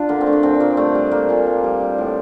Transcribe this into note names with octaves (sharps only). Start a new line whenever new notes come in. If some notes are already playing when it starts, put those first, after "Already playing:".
Already playing: D4 F4
D3 A#3
C4
A3
D4
A#2 C4
A#2 A#3
G3 A3
G3
G3 A#3
A#2 F4
G3
G3
G3
A2